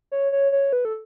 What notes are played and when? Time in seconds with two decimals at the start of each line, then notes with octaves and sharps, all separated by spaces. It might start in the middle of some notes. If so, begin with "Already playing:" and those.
0.12 C#5
0.32 C#5
0.52 C#5
0.73 B4
0.85 A4